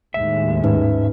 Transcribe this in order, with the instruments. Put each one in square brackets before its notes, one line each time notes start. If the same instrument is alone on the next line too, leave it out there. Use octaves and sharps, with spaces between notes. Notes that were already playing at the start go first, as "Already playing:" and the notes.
[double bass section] D#2 A2 G#3 [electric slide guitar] E5
[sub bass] G#2 [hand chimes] C#4 D#4 B4